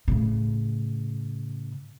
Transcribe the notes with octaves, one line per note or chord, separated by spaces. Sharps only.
A2 C#3